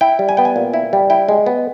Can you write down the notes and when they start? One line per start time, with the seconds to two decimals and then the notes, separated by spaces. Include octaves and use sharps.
0.01 E4 G5
0.19 G3
0.29 G#5
0.37 B3 G5
0.45 G#5
0.56 A#2
0.74 E4
0.93 G3
1.10 E4 G5
1.29 G#3
1.46 B3